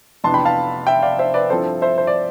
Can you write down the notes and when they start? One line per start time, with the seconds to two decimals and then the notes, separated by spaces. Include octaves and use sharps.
0.24 F1 F2 E3 B3 D4 A5 C6
0.34 G5 B5
0.45 F5 A5
0.87 E5 G5
1.02 D5 F5
1.19 C5 E5
1.34 B4 D5
1.50 G2 F3 C4 E4 A4 C5
1.82 C5 E5
1.98 C5
2.07 D5